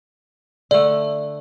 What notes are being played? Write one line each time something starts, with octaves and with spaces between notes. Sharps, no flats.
D3 A3 D5